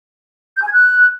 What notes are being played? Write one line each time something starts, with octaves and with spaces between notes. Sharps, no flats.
G6
G#5
G#6
F#6